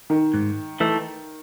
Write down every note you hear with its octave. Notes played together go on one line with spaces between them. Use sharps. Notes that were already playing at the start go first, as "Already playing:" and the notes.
D#3
G#2
E3 A3 D#4 A4